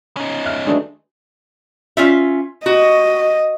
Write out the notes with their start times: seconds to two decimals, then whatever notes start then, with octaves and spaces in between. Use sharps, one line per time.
0.17 C#4 D#4
0.46 E5 F6 F#6
0.66 D#3 E3 F#3 G#3 A3 D4
1.97 C#4 F4 E5
2.66 F#4 D#5